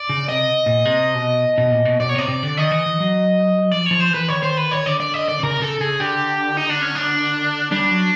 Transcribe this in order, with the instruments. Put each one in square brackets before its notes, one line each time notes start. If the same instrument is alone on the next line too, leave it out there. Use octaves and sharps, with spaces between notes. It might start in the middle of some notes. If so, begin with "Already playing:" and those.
Already playing: [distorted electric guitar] D5
[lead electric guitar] C#3
[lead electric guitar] C3 [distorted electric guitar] D#5
[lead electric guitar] A#2
C3
B2
B2
A#2
B2
[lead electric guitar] B2 [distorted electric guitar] D5
[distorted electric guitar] C#5
[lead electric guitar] C3 [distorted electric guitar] D5
[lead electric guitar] C3
D3
[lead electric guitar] D#3 [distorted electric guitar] D#5
[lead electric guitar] E3
E3
F#3
[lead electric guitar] F3 [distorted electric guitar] D5
[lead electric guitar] F3 [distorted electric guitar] C#5
[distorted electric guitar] C5
[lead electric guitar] E3 [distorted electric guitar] B4
[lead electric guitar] D#3 [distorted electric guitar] C#5
[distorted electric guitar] C5
B4
C#5
[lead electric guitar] D3 [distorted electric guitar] D5
[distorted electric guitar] D5
D#5
D5
[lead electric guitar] C3
[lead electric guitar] C#3 [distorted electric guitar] A#4
[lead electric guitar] C3
[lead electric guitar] C#3 [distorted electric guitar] A4
[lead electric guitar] C#3 [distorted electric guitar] G#4
[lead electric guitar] D3 [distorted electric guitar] G4
[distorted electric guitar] D#4
D4
C#4
D4
[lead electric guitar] G3 [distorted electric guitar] D4
[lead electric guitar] F#3